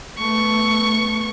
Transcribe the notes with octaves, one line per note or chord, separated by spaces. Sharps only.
A3 B3 C#6